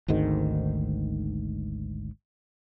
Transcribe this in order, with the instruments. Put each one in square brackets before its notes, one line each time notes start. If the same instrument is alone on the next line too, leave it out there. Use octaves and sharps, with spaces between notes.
[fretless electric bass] G#1 D2 G#2 D#3